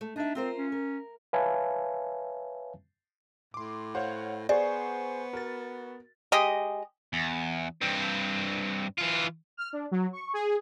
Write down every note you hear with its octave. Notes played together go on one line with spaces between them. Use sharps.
A3
D4 D#4 E5
C4 F4 A#4 C5
C#4
A#4
B4 C#5 E5 F5 G#5 A5
A2 C6 D6
C5 C#5 F5 F#5
B3 G#4 C5 D5 F#5 C#6
F#4 A#4 A6
G#3 G4 D#5
E2
G2 C4
E3 F4
F6
D4
F#3
C#6
G#4